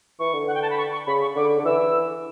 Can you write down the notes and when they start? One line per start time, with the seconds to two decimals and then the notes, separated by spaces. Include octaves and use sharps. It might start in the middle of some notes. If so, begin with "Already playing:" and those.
0.19 E3 C#6
0.33 D3
0.47 F#5
0.54 G5
0.62 A5
0.70 B5
0.78 C#6
0.92 C#6
1.06 C#3 B5
1.22 C#6
1.36 D3 D6
1.59 D3
1.65 E3 E6